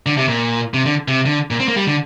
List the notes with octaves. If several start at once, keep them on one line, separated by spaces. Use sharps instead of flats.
D3
C3
A#2
C3
D3
C3
D3
A#2
C4
A#3
G3
D3